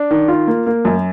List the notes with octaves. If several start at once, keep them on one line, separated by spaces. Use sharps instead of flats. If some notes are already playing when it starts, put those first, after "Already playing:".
Already playing: D4
D#3
F4
A#3
A#3
F#2